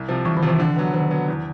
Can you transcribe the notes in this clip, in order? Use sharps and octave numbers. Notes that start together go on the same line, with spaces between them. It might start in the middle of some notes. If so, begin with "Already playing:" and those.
Already playing: C2
C3 F3
C2 E3
D#3
C3 F3
E3
D3
F#3 B3
D3 D#3
F#3 B3
E2